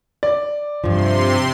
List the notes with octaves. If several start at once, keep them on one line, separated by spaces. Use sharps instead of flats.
D5
G2 C3 F3 C6